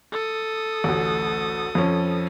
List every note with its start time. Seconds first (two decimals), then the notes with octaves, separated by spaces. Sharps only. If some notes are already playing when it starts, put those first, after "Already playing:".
0.13 A4 D#6
0.84 A1 D2
1.75 F2 F3 C#4